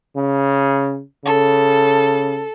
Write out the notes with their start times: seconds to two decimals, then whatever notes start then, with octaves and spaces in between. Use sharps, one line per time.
0.17 C#3
1.25 C#3 A4